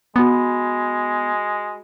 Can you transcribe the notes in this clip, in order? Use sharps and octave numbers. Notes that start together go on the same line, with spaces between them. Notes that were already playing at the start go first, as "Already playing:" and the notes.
G#3 B3 F#4 B5